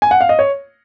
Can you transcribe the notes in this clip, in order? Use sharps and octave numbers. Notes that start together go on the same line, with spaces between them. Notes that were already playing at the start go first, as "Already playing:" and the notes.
G#5
F#5
F5
D#5
C#5